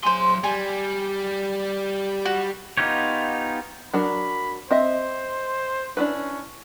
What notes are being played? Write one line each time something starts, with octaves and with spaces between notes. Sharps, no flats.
F#3 G#4 C5 C6
G3 G#5
F#4
B3 D#4 F4 G4 C#5
F#3 D4 A#4 B5
C4 C5 D#5 E5
C#4 D4 E4 B4